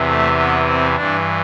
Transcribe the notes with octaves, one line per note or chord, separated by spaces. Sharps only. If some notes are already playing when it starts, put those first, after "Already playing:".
Already playing: E2 C3 E3
A3
B3
C4
G2 E3 D4